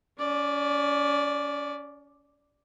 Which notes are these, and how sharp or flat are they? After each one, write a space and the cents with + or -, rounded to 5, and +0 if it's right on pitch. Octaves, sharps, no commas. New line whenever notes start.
C#4 +30 D5 +0